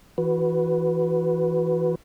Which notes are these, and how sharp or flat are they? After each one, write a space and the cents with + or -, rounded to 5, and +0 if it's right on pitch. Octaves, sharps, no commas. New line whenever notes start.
E3 +0 F#4 +0 B4 +0